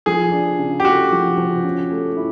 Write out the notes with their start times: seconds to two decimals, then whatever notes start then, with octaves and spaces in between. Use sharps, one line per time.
0.06 F3 G#4
0.32 D4
0.58 C#3
0.80 G4
0.85 A3 F#4
1.12 F3
1.37 F3
1.64 C#4
1.91 A3
2.17 E4